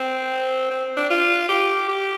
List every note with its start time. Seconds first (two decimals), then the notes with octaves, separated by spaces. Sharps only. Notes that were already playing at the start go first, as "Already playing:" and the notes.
Already playing: C4
0.71 C4
0.97 D4
1.10 F4
1.49 G4
1.88 G4